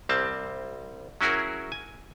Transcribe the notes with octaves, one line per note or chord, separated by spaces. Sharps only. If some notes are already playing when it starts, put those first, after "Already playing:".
C2 G3 C4 A5
F#3 C#4 E4 F#4 G#4 A#4
G#5